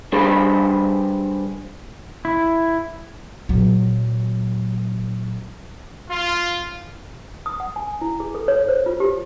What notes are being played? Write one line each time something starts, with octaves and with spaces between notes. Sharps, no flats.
G3 D4 G#4 B4 C5
E4
A#2 F#3
F4
D#6
F#5
G#5
E4
G#4
A4
C#5
C5
F4
G4